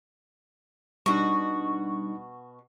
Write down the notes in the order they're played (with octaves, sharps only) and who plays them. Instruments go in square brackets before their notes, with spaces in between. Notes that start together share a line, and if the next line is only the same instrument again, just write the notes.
[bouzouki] B2 F#4 [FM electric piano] G3 D4 [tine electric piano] D#4 C#6